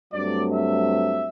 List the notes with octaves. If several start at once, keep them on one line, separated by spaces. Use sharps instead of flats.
G2 F#3 A3 C4 D5
E5